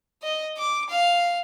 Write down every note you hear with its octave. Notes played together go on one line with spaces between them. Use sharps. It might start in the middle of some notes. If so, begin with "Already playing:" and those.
D#5
D6
F5